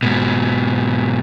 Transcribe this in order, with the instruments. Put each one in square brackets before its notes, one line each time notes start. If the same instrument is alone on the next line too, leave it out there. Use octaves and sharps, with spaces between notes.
[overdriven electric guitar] G#2 B2